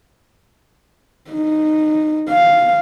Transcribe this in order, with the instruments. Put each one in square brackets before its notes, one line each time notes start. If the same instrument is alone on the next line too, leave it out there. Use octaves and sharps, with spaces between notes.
[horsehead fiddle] D#4
F5